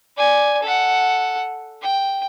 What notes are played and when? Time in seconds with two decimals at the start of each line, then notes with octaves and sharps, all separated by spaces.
0.17 D5 G#5
0.63 A4 F#5
1.82 G5